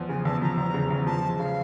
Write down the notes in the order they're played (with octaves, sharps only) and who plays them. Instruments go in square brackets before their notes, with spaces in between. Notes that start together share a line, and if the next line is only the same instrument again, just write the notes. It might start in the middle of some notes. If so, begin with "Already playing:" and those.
Already playing: [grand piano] E2 F3
[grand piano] C#3 [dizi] G#5
[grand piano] E2 [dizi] A5
[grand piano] F3 [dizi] A#5
[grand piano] E2
C#3
E2
[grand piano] F3 [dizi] A5
[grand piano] G#3
[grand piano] C#3 [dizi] F5